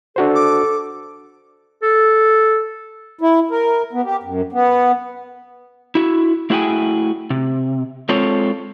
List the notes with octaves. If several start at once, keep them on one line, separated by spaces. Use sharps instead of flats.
D4 F#4 A4 C5
D6
A4
E4
A#4
B3
G4
F#2
B3
E4 F#4
A3 E4 F#4 G#4 G5 G#5
C3
G#3 C4 F4 A4 C#5